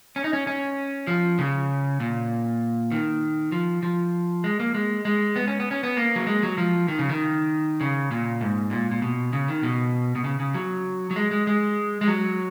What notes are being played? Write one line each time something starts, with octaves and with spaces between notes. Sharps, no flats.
C#4
D#4
C#4
C#4
F3
C#3
A#2
D#3
F3
F3
G#3
A#3
G#3
G#3
B3
C#4
B3
C#4
B3
A#3
F#3
G#3
F#3
F3
D#3
C#3
D#3
C#3
A#2
G#2
A#2
A#2
B2
C#3
D#3
B2
B2
C#3
C#3
F#3
F#3
G#3
G#3
G#3
G#3
F#3